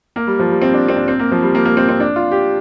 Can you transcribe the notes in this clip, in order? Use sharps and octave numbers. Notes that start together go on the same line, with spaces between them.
A#3
G3
F3
G3
C4
D4
C4
D4
C4
A#3
F3
G3
A#3
A#3
C4
C4
D4
F4
G4